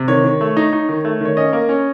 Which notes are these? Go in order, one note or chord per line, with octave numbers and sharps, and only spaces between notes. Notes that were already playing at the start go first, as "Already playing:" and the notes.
Already playing: C3
D#3 C#5
D#3
A3
D#4
D#4
D#3
A3
D#3 C#5
C#4 D#5
A#3
C#4